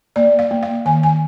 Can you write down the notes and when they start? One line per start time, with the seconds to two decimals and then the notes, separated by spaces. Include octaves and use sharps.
0.16 A#3 D5
0.39 F5
0.51 A#3
0.63 F5
0.86 D#3 G#5
1.03 G#5